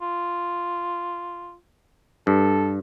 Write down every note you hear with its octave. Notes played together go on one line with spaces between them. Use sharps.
F4
G2 A4